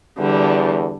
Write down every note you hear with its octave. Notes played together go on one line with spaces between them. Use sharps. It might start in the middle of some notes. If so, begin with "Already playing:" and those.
E2 D3 G3